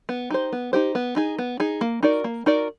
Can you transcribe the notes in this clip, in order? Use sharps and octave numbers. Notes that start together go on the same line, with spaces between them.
B3
D#4 G4 C5
B3
D#4 G4 C5
B3
D#4 G#4
B3
D#4 G#4
A#3
D#4 F#4 A#4 D5
A#3
D#4 F#4 A#4 D5